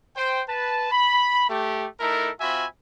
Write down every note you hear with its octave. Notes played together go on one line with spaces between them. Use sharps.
C5 G5
B4 A5
B5
A3 G4
A3 D#4 E4 A4 A#4
C4 F4 F#4 E5 G#5 B5